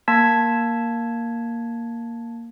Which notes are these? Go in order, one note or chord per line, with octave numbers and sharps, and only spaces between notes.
A#3 A5 G#6 B6